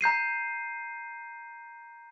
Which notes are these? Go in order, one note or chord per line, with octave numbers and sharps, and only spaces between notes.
A#5 G6 C7 D#7